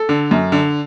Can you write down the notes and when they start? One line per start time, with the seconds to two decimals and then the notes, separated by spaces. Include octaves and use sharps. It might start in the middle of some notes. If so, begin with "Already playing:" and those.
Already playing: A4
0.09 D3
0.31 F#2
0.52 D3